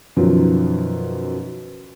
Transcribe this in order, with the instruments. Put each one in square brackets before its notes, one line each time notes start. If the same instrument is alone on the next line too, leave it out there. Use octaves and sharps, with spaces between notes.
[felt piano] F#2 B2 D#3 F3 F#3